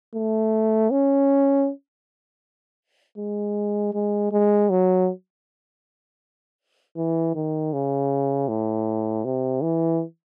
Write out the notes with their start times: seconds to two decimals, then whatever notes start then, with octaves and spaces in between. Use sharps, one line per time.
0.15 A3
0.91 C#4
3.18 G#3
3.94 G#3
4.32 G#3
4.70 F#3
6.97 E3
7.35 D#3
7.73 C#3
8.48 A2
9.25 C3
9.62 E3